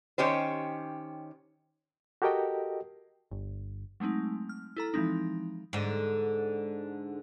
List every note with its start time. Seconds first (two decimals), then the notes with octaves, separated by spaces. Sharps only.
0.18 D#3 C#4 G4 C5
2.22 F#4 G4 A4 A#4 D#5 G5
3.31 G1
4.00 F#3 G#3 A3 C4 D#4
4.49 F6
4.77 E4 A4 A#5
4.94 E3 F3 G#3 C4 D#4
5.73 G#2 D3